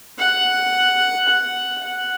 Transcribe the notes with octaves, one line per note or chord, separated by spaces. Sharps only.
F#5
F#5
F#5